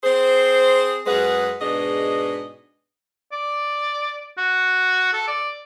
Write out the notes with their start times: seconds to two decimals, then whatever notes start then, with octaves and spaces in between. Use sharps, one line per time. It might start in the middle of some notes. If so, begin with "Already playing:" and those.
0.04 C4 G#4 C5
1.06 F#2 G#3 G#4 B4 F#5
1.61 G#2 B2 D4 G#4 D#5
3.32 D5
4.38 F#4
5.13 A4
5.28 D5